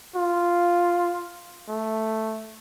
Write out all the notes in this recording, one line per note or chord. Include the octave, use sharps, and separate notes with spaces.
F4
A3